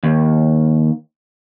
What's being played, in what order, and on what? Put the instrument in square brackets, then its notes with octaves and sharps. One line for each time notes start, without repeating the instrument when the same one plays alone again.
[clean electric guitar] D#2